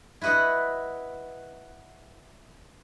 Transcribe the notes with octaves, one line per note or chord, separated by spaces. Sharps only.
E4 F#4 B4 D#5 F#5